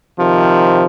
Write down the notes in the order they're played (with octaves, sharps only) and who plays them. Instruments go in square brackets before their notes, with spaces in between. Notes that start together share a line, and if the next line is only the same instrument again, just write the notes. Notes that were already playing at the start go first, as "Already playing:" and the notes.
[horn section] C3 D#3 F3